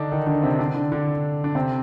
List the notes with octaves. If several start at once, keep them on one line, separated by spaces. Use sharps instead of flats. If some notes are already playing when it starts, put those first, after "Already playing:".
Already playing: D3 D4 D#4
D#3 D#4
D3 D4
C3 C4
D3 D4
D3 D4
D3 D4
D4
C3 C4